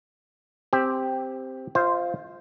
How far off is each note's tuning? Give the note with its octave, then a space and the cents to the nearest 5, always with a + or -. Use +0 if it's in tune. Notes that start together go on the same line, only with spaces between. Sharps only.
C4 +0 G4 +5
F4 +0 C5 +0 D#5 +45